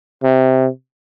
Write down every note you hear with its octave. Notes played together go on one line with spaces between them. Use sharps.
C3